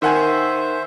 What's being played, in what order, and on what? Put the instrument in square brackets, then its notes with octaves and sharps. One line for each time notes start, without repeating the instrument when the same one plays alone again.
[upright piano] D#3 F#5 G#5 [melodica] C5 E5